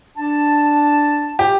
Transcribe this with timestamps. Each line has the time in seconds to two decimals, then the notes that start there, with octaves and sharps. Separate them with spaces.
0.17 D4 A5
1.39 G4